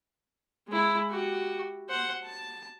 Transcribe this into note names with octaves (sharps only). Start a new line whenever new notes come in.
G#3 E4
F#4 G4
C5 F#5
A5